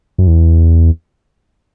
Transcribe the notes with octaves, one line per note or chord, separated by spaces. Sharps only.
F#2
E2